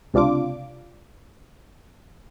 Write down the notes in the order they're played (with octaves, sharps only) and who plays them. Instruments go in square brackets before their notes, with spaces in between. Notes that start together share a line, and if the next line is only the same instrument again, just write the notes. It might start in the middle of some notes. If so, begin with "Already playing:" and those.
[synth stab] C#2 C3 D4 F4 D6